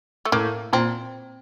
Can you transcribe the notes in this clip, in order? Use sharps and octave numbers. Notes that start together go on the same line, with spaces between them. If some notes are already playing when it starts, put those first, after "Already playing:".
A3
A2 A#3
A#2 C4